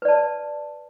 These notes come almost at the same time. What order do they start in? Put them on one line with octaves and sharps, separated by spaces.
B4 D5 A5